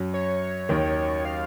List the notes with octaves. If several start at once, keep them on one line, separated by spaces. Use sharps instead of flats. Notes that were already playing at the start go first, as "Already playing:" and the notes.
Already playing: F#2 F#3
C#5
D#2 D#3
F5